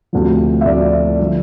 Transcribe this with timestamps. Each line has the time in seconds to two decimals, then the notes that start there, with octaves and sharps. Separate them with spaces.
0.13 D2 C3 F3
0.61 E5
0.65 D2 C3 F3 D5
1.20 D3 F3